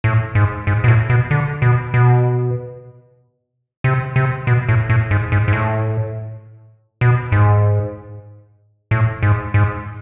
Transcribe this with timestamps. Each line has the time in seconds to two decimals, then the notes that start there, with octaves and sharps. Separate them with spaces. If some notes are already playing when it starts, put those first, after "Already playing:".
0.04 A2
0.35 G#2
0.67 G#2
0.84 B2
0.88 A2
1.10 B2
1.31 D3
1.62 B2
1.94 B2
3.84 C3
4.16 C3
4.47 B2
4.69 A2
4.90 A2
5.11 G#2
5.32 G#2
5.48 G#2
5.53 A2
7.01 B2
7.32 G#2
8.91 A2
9.23 G#2
9.54 G#2